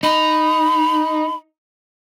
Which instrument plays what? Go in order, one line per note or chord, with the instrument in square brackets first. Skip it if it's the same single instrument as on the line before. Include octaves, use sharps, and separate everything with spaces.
[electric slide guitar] D#4 [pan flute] B5